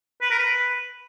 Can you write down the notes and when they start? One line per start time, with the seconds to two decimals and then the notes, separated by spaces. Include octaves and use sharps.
0.21 B4
0.30 A#4
0.39 B4